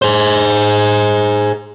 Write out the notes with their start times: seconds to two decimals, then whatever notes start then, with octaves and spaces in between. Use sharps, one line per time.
0.02 G#4 C5